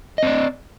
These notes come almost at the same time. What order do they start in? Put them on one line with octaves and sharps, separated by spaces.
D#5 C4 D5